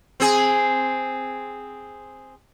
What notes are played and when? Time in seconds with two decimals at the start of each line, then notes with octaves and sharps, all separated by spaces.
0.20 C4 G#4